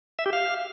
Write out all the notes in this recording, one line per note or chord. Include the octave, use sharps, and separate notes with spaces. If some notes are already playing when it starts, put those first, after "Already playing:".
E5
G4
F5